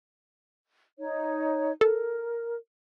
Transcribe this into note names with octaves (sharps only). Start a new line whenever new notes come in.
D#4 C#5
A4 A#4